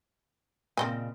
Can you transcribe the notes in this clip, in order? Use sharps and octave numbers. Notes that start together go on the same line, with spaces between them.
A#2 C#3 C4 D#5 G#5